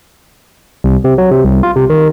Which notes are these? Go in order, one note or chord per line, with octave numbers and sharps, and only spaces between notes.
C2
C3
F#3
C3
C2
F4
C3
D#3